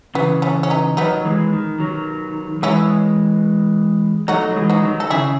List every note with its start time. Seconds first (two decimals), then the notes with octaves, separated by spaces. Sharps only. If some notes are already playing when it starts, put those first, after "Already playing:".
0.15 C#3 E3 B3
0.42 A3 C#4
0.63 C#4
0.70 B3 D#4
0.97 D#3 F#3 B3 D#4
1.25 E3 G#3
1.53 D#3
1.80 D#3 F#3
2.62 E3 G#3 C#4 E4
4.28 F#3 A3 D#4 F#4
4.51 F#3
4.55 E3 G#3
4.70 D#4 F#4
4.83 D#3 F#3
5.00 A4
5.10 C#3 E4 G#4